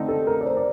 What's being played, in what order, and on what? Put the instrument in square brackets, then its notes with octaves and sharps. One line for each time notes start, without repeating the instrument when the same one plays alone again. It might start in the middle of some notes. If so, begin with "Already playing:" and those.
Already playing: [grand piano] D3 A3 C4 D#4
[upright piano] A4
A#4
D5
C5
D5